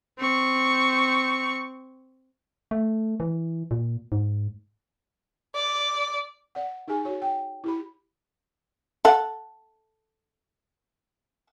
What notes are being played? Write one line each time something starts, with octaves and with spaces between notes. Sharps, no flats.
C4 C#6
A3
E3
A#2
G#2
D5
D5 F#5
D#4 G4 G#4 G#5
F#4 C#5
G5
E4 G4 B5
A4 F#5